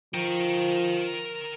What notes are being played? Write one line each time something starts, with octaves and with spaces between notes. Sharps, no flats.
F3 A#4 G5